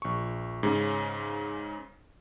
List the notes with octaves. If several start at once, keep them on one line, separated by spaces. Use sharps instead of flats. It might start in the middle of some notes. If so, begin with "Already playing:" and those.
A#1 C#6
G#2 C#3 C#4